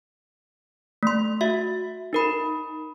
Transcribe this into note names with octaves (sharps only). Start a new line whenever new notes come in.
A3 C6
F#4 E5
D#4 A#4 B5